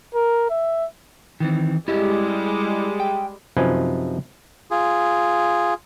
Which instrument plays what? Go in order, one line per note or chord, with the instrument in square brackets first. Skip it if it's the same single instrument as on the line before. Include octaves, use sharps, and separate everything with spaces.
[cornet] A#4
E5
[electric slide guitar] D#3 E3 C4
[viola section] G3 G#3 [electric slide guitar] E4 G4 D#5
[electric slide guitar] G5
[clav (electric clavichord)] F#2 C3 F3 D#4 B4 G#5
[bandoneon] F4 G#4